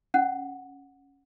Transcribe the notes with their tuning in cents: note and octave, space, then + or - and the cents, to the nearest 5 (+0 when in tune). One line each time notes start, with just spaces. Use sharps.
C#4 +0 F#5 -10